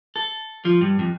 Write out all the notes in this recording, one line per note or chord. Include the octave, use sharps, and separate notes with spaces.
A4
F3
G2
F2